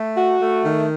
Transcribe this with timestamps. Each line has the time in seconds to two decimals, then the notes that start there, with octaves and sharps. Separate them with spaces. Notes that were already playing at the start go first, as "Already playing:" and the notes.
Already playing: A3
0.16 F#4
0.40 A3
0.65 D#3